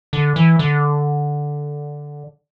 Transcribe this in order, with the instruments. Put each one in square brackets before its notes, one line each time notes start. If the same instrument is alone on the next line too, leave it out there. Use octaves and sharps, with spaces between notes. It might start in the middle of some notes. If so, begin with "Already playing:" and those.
[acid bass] D3
E3
D3